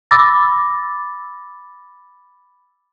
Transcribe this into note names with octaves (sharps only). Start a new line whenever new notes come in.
B5 D6 E6 A6 A#6